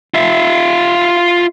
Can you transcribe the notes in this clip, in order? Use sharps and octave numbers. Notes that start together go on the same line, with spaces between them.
F4 E5